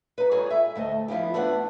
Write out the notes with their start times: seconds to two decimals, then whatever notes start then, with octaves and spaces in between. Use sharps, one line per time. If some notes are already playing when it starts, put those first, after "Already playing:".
0.18 D#4 B4
0.31 G3 F4 G#4 A4 C#5
0.50 E5
0.75 D2 A3 C5 D#5
1.08 F3 B3 E4 F4 G4
1.34 A3 B3 C4 D4 D5 F#5